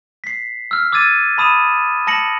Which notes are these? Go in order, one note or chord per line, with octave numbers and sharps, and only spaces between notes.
B6 C7
E6 F6
D6 E6 G#6 A6 D#7
A5 B5 D#6 D#7 E7
A5 A#6 C#7 F#7